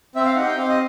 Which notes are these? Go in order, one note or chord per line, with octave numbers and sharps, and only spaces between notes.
C4 E5
F5
D#4 G4 F#5
G5
C4 F5
D#5